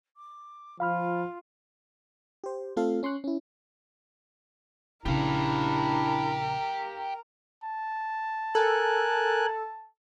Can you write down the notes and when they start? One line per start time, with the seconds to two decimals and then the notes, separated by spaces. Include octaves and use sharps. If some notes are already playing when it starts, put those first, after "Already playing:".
0.17 D6
0.80 F3 F4 F5 B5 F6
2.44 G4 C5
2.77 A3 C4 F4 A4 F5
3.03 C#4 C6 C#6 F#6
3.24 C#4 E4
5.06 A#1 C#3 D4 E4 G4 A#4 F5
7.64 A5
8.55 A4 A#4 G#5 F#6